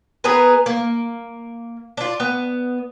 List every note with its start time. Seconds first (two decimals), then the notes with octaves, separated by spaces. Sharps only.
0.24 B3 G#4 A#4 B4
0.66 A#3
1.97 D4 F4
2.20 B3